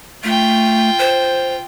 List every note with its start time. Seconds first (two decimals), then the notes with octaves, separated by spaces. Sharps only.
0.24 A3 F4 G5
0.99 C5